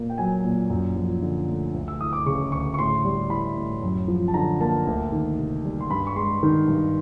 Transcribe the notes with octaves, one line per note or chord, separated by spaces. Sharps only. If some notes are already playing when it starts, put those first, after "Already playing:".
Already playing: A#2 A#3
G5
F#3 G#5
A#2
F#2
F3
D3
A3
D2
E6
E3 D#6
D6
C#3 C#6
D2 C#6
C#6
A2 C6
G3
E3 B5
A2
F#2
F3
A5
D3 A#5
A#3 A5
D2
D#3
C3
G3
C6
G2 B5
C#6
G#3 C6
D#3
G2